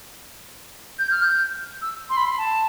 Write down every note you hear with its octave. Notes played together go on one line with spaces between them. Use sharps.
G6
F6
G6
E6
C6
B5
C6
A5